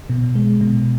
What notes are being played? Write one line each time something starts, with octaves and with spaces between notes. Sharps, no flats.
B2
G#3
B2